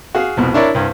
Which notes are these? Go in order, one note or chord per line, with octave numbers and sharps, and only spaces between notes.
F#4 G#4 F5
C2 F2 B2
D4 E4 A#4 C#5 D5
C2 G2